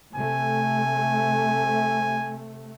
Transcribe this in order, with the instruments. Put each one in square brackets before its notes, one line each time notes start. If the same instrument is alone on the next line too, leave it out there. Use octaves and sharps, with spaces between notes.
[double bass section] C3 A3 [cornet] G#5